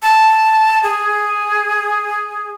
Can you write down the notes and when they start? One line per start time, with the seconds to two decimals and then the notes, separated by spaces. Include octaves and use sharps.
0.03 A5
0.83 G#4